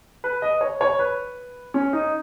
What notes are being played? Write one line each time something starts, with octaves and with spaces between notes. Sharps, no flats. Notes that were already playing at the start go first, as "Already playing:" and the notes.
B4
D#5
C#5
C#5
B4
C#4
D#4